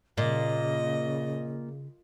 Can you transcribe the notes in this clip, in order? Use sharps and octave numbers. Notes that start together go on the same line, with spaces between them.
A#2 C#3 D#5